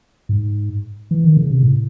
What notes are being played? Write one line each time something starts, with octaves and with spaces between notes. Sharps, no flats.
G#2
E3
D#3
C#3
C3
A2